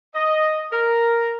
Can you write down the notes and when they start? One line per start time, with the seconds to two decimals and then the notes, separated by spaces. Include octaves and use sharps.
0.15 D#5
0.72 A#4